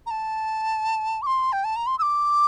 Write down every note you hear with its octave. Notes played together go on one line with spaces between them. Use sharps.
A#5
A5
D6
C6
G5
A5
A#5
C6
E6
D6